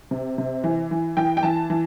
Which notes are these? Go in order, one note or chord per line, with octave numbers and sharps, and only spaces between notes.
C3
C3
E3
E3
E3 G5
G5
E3 A5
E3